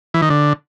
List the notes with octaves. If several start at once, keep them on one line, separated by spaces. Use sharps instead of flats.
E3
D#3
D3